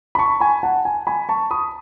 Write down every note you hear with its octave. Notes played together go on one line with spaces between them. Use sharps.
B5
A5 C#6
G#5 B5
F#5 A5
G#5
G#5 B5
A5 C#6
B5 D#6